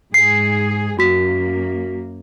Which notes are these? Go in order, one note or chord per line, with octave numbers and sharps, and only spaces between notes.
G#2 G#4 C7
F#2 A#3 F#4 B6